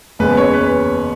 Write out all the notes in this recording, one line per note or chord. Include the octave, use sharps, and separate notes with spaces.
F#1 E2 C#3 G#3 B4
C#5
B4